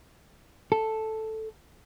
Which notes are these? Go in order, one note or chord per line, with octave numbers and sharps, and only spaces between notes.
A4